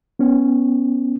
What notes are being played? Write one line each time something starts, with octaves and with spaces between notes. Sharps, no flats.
B3 C#4